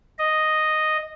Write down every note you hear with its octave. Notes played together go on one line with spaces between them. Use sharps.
D#5